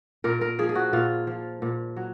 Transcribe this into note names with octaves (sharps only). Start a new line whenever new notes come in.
A#2 A#4
A#4
F3 G#4
G#4
F#4
A#2 F4
F3
A#2
F#3